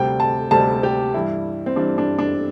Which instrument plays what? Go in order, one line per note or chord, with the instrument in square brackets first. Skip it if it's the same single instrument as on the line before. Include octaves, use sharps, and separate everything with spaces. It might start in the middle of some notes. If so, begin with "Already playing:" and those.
Already playing: [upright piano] D2 C3 G3 G5
A5
D2 C3 G3 A5
G4
G2 E3 G3 E4
C4
G2 E3 G3 D4
D4
D4